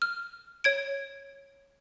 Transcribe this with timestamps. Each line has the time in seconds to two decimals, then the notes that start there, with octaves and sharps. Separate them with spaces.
0.02 F6
0.64 C#5 G#6 D7